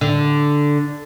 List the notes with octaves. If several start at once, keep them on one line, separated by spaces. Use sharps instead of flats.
D3